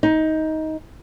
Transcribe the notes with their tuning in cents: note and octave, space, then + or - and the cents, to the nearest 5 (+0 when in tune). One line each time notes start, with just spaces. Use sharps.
D#4 +15